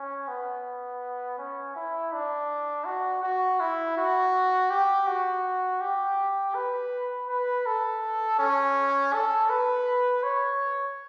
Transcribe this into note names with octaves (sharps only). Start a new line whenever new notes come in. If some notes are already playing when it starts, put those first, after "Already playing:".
Already playing: C#4
B3
C#4
E4
D4
F#4
F#4
E4
F#4
G4
F#4
G4
B4
B4
A4
C#4
A4
B4
C#5